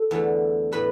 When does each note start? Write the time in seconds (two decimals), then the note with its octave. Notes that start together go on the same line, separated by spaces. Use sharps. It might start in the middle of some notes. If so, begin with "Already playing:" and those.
Already playing: A4
0.11 E2 D3 A3
0.72 A2 A3 B4 B5